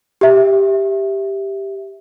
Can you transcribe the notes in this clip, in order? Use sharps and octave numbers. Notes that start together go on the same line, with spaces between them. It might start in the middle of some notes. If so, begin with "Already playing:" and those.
G4 E5